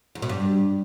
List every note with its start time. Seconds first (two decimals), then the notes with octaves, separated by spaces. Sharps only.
0.15 E2
0.22 B2
0.29 G2